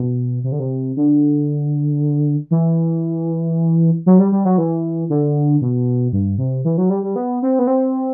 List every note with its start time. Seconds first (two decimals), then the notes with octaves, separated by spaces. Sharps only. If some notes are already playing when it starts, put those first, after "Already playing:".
Already playing: B2
0.44 C3
0.52 D3
0.60 C3
0.96 D3
2.51 E3
4.06 F#3
4.19 G3
4.32 G3
4.45 F#3
4.58 E3
5.10 D3
5.61 B2
6.12 G2
6.38 C3
6.65 E3
6.78 F#3
6.90 G3
7.03 G3
7.16 B3
7.42 C4
7.59 B3
7.67 C4